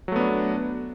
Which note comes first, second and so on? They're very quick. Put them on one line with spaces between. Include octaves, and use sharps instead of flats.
F#3 A3 B3 D4